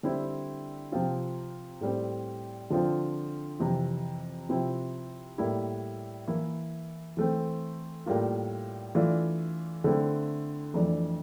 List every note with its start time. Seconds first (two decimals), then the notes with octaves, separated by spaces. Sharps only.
0.03 D3 G3 C4 E4
0.92 C3 F3 C4 F4
1.81 A2 G3 C4
2.70 D3 F3 C4 F4
3.60 F2 C3 E3
4.49 C3 F3 C4 E4
5.38 A2 G3 A#3 E4
6.27 E3 A#3 E4
7.17 E3 A3 C4
8.06 A2 G3 A#3 F4
8.95 E3 A3 D4 F4
9.84 D3 A3 C4 E4
10.74 F2 E3 A3 D4